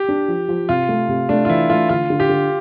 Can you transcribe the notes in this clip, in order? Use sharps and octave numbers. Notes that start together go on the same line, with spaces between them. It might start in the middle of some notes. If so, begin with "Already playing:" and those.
Already playing: G4
D4
F3
F3
C3 F4
A3
C3
A3 D4
F4
E3 E4
A3 F4
D3 F4
D3
G4
D3